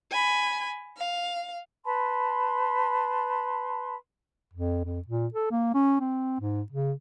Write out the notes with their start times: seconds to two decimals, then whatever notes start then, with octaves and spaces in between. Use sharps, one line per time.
0.10 G#5 B5
0.97 F5
1.85 B4 A5 B5 C6
4.53 F2
4.85 F2
5.07 A#2
5.34 A4
5.51 A#3
5.74 C#4
6.00 C4
6.41 G#2
6.72 C#3